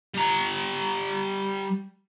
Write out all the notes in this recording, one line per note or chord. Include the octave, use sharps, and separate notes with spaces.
G3 A#5